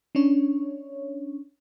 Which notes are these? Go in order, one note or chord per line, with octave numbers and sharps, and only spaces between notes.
C#4 D4 C#5